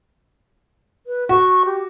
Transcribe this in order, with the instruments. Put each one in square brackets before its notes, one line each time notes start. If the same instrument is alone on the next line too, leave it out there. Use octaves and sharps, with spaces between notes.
[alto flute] B4
[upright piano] F#4 [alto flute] C#6
[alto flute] G4